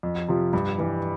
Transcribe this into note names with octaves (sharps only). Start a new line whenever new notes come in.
F2
C3 F3
G2
E3 G3